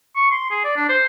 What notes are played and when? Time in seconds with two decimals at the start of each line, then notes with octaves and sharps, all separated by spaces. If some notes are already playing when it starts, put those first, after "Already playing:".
0.16 C#6
0.31 C6
0.51 G#4
0.65 D5
0.77 D4
0.89 C5